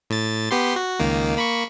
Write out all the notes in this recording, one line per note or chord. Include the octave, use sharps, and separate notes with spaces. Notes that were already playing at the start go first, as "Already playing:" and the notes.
A2 A6
B3 G4 C6
F#4
C#2 D#3 A#3
A#3 B5 C#6